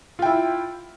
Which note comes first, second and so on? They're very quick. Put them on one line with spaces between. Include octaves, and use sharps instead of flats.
F4 G5 E4